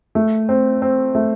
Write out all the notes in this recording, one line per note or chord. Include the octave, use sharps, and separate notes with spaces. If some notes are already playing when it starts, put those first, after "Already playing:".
A3
C4
C4
A3